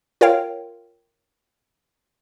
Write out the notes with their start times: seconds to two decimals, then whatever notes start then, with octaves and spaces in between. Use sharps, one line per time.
0.21 F4 A#4 C#5 F5 G5